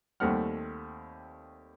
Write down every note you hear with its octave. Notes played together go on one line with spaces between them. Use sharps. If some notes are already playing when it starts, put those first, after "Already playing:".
D#2 G3 A3 C4 F#5 F6